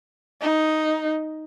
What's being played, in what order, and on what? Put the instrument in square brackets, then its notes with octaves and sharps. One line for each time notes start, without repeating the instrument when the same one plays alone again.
[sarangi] D#4